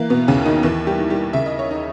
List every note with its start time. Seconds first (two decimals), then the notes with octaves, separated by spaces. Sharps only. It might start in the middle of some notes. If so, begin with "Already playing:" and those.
Already playing: E3 A#3
0.10 B2 B3
0.28 D#2 C#3 C#4
0.46 D#3 D#4
0.63 D#2 E3 E4
0.87 G3 G4
0.98 D#3
1.10 G3 G4
1.33 C#3 E5
1.46 D#5
1.59 C#5
1.71 D#4 D#5